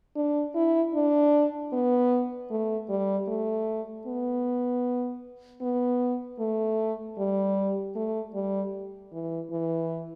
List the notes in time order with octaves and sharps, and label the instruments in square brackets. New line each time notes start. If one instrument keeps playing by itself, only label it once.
[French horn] D4
E4
D4
B3
A3
G3
A3
B3
B3
A3
G3
A3
G3
E3
E3